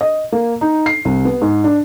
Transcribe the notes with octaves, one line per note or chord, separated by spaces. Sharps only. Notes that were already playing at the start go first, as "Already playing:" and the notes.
D#5
A#3
D#4
C7
C2
B3
G#2
D4